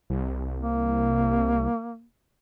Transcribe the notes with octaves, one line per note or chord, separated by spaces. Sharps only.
C2
A#3